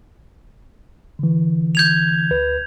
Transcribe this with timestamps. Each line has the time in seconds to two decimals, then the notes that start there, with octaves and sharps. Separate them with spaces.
1.19 D3 E3
1.75 G6 G#6 F7
2.31 D2 B4